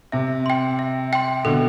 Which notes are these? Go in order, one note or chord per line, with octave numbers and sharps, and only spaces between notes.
C3 E5
G5 C6
E5
G5 C6
B2 D3 A4